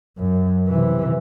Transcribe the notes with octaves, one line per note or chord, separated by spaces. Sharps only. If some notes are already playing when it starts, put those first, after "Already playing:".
F#2
C3 E3